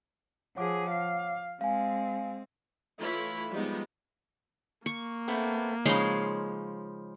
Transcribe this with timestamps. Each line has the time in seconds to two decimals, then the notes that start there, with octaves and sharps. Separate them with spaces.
0.56 F3 G#4 C#5 F#5 D6
0.91 F5
1.61 G#3 C4 F5 G#5
2.99 E3 A3 E4 F4 C#5 B5
3.51 F3 G3 G#3 B3 D#4
4.86 A#3 C#6
5.28 A3 B3 C4
5.86 C#3 F3 G#3 D#4 C#5 C6